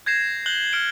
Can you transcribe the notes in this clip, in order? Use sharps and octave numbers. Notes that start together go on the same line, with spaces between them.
G6 G#6 A#6 C7 E7
F#6 G6 F#7 G7
F6 C#7 D7 G7